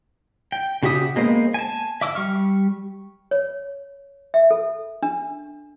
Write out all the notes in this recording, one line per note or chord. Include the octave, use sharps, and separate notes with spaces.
G5
C#3 F#4 G4 E5 D#6
G#3 A#3 B3 C5
G#5 A5
E5 D6 E6
G3 C#6 F6
C#5
E5
A4
D4